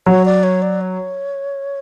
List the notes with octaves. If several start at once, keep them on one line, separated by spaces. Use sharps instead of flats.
F#3 C#5
D5
C#5
D5
C#5